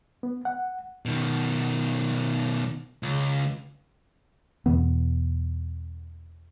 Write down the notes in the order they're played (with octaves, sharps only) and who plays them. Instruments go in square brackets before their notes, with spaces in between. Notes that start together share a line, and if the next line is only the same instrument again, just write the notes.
[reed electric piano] B3
F#5
[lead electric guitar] B2 D#3
C#2
[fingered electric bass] E2 B2 E3 B3